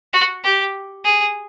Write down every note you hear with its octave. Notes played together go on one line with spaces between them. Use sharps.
F#4
G4
G#4